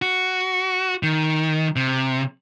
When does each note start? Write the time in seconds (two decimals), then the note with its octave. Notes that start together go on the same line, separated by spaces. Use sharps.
0.02 F#4
1.03 D#3
1.76 C3